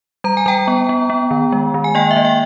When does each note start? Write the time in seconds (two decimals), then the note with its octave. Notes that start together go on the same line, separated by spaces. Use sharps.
0.24 G3 A#5
0.37 G#5
0.46 G3 G5 A#5
0.67 B3
0.89 B3
1.10 B3
1.31 D#3
1.52 G#3
1.74 D#3
1.84 G#5
1.95 A#3 D#5 G5
2.11 E5
2.17 A#3
2.25 G5